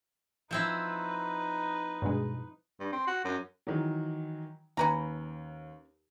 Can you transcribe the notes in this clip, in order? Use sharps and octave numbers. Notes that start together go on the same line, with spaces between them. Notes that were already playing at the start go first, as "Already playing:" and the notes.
F3 C4 D#4 E4 B4
G2 B2 G#3
G2
C4
F#4
F#2
D#3 E3 F#3
D#2 C#4 B4 A#5